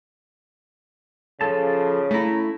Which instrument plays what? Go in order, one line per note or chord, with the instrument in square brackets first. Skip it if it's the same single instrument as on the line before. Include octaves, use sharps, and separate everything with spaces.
[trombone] C#3 [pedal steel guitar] F3 A4 A5
[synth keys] A3 E4 [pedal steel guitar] C#4 A#5